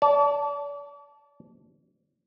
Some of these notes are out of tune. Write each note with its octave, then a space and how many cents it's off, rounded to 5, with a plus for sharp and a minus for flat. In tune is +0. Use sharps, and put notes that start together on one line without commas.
D5 -40 A5 -10